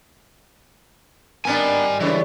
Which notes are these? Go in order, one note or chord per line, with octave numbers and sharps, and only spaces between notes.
D#3 G3 A#3 B3 D4 A#4 G#5
G2 C#3 E3 G#3 C#5